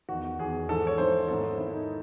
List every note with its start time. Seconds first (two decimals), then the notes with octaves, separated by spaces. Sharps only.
0.09 E2 D#3 F#4
0.39 E2 D#3 G#4
0.68 G#2 E3 A4
0.87 C#5
0.98 G#2 E3 C5
1.28 G#2 D#3 A4
1.57 G#2 D#3 E4
1.73 D#4